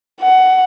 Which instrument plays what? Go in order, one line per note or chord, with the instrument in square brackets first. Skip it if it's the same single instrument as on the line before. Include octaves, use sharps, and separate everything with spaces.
[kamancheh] F#5